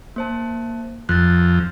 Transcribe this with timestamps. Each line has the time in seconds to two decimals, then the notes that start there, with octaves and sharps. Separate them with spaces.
0.16 A#3 C5 A5
1.09 F2 F#6 A6